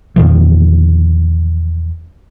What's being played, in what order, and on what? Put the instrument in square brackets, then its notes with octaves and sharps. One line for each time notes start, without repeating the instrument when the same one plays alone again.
[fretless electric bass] E2 A#2 D#3 F3